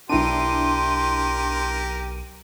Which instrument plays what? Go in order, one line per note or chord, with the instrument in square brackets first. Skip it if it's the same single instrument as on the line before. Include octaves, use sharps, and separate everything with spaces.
[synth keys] B1 D#7 [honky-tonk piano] D4 E4 [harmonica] G4 A#4 [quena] C6